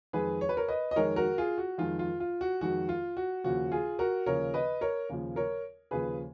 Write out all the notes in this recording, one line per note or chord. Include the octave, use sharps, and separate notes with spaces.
F2 D#3 G#3 G#4 B4
C#5
B4
A#4 C#5
B4 D#5
D#5
F2 D#3 G#3 A#4 C#5
F#4 A#4
F4 G#4
F#4
F2 D#3 G#3 F4
F4
F4
F#4
F2 D#3 G#3 F#4
F4
F#4
D#2 C#3 F3 F#4
F4 G#4
F#4 A#4
D#2 C#3 F3 A#4 C#5
B4 D#5
A#4 C#5
D#2 C#3 F3
A#4 C#5
D#2 C#3 F3 G#4 B4